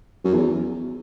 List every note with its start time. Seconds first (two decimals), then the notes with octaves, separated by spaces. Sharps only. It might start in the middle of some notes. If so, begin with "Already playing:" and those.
0.24 F#2
0.34 E2